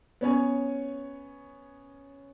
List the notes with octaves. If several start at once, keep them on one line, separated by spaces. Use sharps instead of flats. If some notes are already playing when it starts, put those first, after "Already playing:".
B3 C#4 C#5 G#5